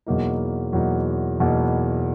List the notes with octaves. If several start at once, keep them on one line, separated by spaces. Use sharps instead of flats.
E2 B2 F#3 A#3 D#4
E2 B2 F#3 A#3 D#4
E2 B2 F#3 A#3 D#4